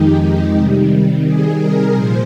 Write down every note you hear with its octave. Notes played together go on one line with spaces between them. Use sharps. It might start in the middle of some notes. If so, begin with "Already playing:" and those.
Already playing: F2 D#3 G#3 D#4 G4
C3 D#3 G3
G#4
A#4
A#2 F3 C5